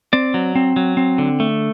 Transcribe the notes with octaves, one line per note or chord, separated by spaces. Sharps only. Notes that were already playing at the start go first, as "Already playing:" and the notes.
C4 D5
F#3
C4
F#3
C4
D3
A3